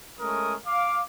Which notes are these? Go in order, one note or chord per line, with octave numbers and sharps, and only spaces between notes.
G#3 A3 C#4 A#4 D#6
F5 D6